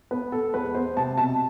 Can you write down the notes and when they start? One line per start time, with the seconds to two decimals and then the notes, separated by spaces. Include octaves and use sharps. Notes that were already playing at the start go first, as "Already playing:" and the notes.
0.11 B3 B4
0.32 B3 A4
0.54 E2 B4
0.75 B3 C5
0.97 C3 A5
1.18 B2 A5